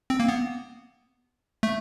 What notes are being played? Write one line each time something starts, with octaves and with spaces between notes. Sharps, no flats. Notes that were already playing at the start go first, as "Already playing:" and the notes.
C4
A#3
B3
A3